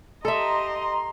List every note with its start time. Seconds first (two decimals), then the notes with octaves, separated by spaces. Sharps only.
0.25 G4 A4 D#5 E5 A#5 C6